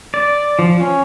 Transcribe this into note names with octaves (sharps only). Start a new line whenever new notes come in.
D5
F3
C#4